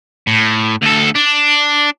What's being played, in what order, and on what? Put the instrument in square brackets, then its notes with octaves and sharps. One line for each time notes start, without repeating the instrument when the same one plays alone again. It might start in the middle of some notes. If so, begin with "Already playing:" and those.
[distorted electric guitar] A2
D2 A4
D4